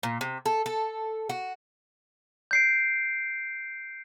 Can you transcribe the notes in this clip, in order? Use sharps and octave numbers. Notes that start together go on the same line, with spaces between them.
A#2
C3
A4
A4
F#4
G6 C7 D7